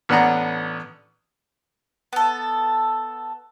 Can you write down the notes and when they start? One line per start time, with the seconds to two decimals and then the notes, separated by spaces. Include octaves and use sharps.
0.09 A1 B3 D4 F#5 A#5
2.13 B3 A4